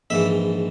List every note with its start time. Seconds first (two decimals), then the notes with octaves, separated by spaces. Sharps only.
0.10 A#1 G#2 E3 E5